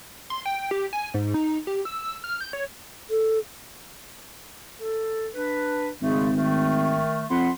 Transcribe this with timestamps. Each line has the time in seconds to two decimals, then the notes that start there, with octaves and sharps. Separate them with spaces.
0.30 C6
0.46 G5
0.71 G4
0.93 G#5
1.14 G#2
1.34 D#4
1.67 G4
1.85 E6
2.24 F6
2.41 G6
2.53 C#5
3.10 A4
4.79 A4
5.34 D4 B4
6.02 G#1 C#3 G#3 A3
6.36 D#3 A3
7.30 F2 F#5 B5 C6